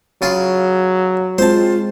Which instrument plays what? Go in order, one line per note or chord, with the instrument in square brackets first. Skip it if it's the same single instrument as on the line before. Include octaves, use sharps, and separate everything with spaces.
[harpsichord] C#3 F4 G#4 [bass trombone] F#3
[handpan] G#3 C4 [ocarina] F4 [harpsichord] C5 A5